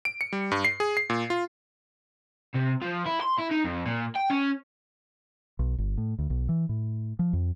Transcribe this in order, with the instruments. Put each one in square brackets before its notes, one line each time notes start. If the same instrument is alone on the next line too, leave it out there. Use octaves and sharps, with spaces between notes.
[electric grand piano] D7
C#7
G3
G2
C7
G#4
C7
A#2
F4
[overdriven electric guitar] C3
F3
E4
C6
E4
D#4
F2
A#2
G5
C#4
[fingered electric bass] B1
G1
A2
D2
B1
E3
A2
F3
F2